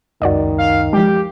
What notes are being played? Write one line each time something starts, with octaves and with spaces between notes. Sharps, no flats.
C#2 F#2 D#3 F#4 D5 D#5
F5
F3 G#3 G4